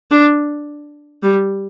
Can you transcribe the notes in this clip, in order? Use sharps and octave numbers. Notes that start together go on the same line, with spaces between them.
D4
G3